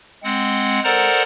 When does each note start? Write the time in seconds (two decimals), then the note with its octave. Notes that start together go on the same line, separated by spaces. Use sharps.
0.24 G#3 C4 F#5
0.84 A4 A#4 C5 D5 F#5 A#5